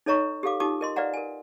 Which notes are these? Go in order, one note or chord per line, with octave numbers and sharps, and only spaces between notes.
D#4 A4 C#5 D#5 A#5 C#6
G4 A4 F5 D6
D#4 F4 G4 A5 D6 D#6
A#4 D#5 C6
B4 D5 D#5 F5 F#5 A#5
A#4 G#5